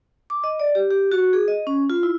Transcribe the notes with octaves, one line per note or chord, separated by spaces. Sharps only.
D6
D#5
D5
G4
G4
F#4
G#4
D#5
C#4
F4
E4